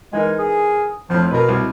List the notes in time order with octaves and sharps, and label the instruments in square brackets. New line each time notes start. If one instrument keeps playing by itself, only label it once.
[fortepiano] E3 D#4 A#4 [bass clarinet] G#3
[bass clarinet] G#4
[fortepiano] F2 A2 [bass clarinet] F3
[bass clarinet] B2 [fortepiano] A#4 B4
[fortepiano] C2